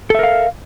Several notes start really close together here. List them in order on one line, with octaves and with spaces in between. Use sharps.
A4 E5 A#4 F5